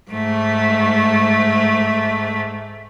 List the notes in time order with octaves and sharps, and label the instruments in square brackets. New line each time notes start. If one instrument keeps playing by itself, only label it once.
[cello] G#2 A3